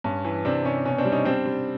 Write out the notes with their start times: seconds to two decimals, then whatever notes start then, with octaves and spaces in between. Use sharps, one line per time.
0.04 G2 C#4
0.24 E3
0.45 C3 C4 D4
0.65 C3 C#4
0.85 B2 C#4
0.98 C4 D4
1.05 G3
1.12 C#4 D#4
1.25 G3 C4 D4
1.46 G3